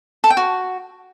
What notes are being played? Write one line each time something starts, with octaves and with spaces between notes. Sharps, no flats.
A4
G5
F#4